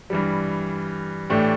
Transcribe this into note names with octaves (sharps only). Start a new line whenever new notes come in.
G2 E3 G3
A2 E3 A3 D4 G4